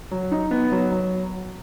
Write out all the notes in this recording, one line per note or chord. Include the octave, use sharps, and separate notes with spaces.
F#3
D#4
B3
F#3
F#3